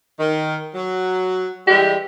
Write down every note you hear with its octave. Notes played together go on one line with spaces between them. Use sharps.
D#3
F#3
E3 G3 G#3 G4